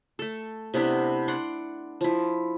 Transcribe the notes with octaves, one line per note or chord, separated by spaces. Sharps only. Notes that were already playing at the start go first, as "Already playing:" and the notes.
A3 A4
C3 B3 D4 E4
D4 D5 F#5 C6
F3 E4